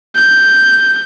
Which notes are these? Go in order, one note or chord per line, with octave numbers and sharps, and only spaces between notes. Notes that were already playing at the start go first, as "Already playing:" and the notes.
G6